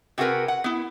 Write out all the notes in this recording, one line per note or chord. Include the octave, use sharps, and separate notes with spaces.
C3 F#4 G#4 A#4 B4
F#5
B3 E4